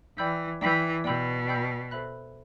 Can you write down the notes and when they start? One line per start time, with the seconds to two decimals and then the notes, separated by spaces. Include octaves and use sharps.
0.18 E3 D5 G5 B5 E6 G6
0.61 E3 D5 G5 B5 E6 G6
1.04 B2 D5 G5 B5 E6 G6
1.47 D5 G5 B5 E6 G6
1.91 A4 C5 E5 B5 F#6